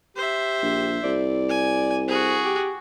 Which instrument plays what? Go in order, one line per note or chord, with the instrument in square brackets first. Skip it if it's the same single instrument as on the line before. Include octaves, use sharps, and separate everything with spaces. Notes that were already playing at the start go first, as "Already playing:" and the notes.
[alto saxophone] G4 [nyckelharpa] C5 E5
[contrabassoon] A#1
[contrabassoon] C2 [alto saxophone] D5
[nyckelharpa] G#5
[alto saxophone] C4 [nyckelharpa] F#4 G#4
[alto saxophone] G4